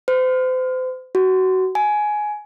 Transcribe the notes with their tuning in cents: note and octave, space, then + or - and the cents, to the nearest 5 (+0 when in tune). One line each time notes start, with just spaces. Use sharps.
C5 -35
F#4 +20
G#5 +15